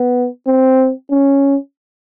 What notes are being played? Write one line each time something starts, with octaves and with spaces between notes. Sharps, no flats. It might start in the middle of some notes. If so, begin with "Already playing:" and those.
Already playing: B3
C4
C#4